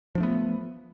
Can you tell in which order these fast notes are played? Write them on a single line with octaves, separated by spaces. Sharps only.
F3 D4 A3 B3